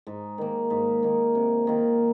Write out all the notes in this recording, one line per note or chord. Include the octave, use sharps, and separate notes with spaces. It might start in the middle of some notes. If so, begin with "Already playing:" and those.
G#2
D#3 A#3
G#2
D#3 A#3
C3
D#3 A#3 F4